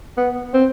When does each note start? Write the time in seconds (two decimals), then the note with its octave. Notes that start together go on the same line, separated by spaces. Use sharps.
0.17 B3
0.54 C4